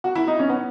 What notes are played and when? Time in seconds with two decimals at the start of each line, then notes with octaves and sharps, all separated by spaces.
0.04 F#4
0.15 E4
0.27 D#4
0.39 C#4
0.49 B3